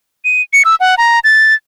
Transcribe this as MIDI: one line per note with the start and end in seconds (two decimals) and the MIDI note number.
0.25 0.42 99
0.53 0.63 97
0.65 0.75 88
0.80 0.95 78
0.98 1.19 82
1.24 1.54 93